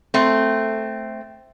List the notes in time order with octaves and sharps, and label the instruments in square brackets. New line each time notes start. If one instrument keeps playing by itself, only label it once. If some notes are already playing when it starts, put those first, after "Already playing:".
[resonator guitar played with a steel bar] A3 C4